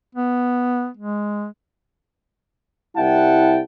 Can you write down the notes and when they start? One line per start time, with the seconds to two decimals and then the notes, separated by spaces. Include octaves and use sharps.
0.15 B3
0.97 G#3
2.96 C2 G3 E4 F#5 G5 A5